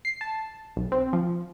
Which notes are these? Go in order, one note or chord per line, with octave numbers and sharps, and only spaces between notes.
C7
A5
B1
C4
F3